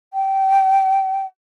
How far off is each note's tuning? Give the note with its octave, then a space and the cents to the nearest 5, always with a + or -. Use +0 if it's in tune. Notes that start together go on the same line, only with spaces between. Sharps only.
G5 -20